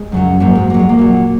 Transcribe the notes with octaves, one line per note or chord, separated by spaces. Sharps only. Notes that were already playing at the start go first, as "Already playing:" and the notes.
Already playing: G#3
F#2 C#3 F#3
G#2 F#3 A#3
G#3
G#2 F#3 A#3
G#3
A#3
A#2 F#3